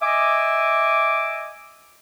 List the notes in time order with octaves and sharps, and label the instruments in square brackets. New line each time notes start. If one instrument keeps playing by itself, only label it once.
[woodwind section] D#5 E5 G#5 D6